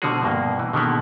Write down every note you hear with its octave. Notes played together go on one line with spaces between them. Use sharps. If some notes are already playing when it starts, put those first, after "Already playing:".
B2 D3 F3 G#3 F#4 G#4
G2 B2 A#3
E3
B2 D3 D#3 G#3 A#3 B3